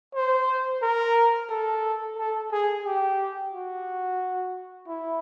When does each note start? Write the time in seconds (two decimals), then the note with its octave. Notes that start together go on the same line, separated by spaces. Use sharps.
0.15 C5
0.82 A#4
1.49 A4
2.17 A4
2.52 G#4
2.85 G4
3.53 F#4
4.88 E4